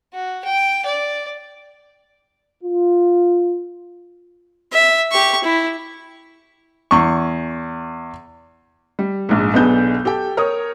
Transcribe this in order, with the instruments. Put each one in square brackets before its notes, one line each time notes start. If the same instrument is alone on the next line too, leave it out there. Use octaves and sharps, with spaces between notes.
[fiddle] F#4
G5
D5
[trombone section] F4
[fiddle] E5
G4 C#6
E4
[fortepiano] E2 C#6
[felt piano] G3
A#1 G#2
B1 B2 B3 D4 G#4 G6
G4 A4 G5
A#4 C#5 D#6